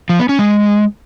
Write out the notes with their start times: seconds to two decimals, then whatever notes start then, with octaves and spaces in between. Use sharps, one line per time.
0.09 F3
0.19 B3
0.29 C#4
0.39 G#3